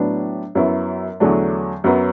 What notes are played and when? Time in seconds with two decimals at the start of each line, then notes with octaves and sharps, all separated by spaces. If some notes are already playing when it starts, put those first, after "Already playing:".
Already playing: A2 F#3 B3 D4
0.55 F#2 F#3 B3 E4
1.20 E2 D3 F#3 A3 D4
1.84 F#2 F#3 B3